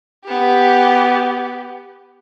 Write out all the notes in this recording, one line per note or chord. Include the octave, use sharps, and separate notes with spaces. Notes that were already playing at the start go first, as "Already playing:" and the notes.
B3 G4